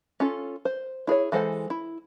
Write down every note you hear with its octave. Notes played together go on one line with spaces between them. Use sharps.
C#4 F4 A4
C5
E4 G#4 B4 C#5
E3 G#3 A4 C5 F#5
E4